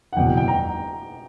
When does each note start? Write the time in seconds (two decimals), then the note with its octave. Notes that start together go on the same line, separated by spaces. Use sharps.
0.13 F#5
0.17 F#1 E2 B2 G5
0.27 G5
0.37 G5
0.48 A#5